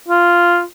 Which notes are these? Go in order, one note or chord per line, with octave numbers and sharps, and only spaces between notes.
F4